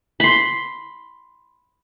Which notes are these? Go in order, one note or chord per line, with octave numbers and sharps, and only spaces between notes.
B5 C6